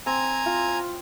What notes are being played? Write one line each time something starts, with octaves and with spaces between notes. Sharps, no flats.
C4 G#5 A#5
F4